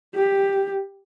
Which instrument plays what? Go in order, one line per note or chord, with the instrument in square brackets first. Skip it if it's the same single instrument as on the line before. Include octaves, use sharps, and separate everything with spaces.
[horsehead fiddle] G4